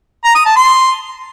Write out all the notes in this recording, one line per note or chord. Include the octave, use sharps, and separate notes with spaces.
A#5
D#6
A5
C6